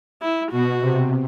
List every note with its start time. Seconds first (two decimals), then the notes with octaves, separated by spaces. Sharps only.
0.22 E4
0.51 B2 F#4
0.80 C3